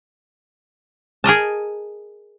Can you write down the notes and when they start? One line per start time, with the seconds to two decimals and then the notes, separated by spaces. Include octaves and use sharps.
1.24 G#4 A#4 D#5 A5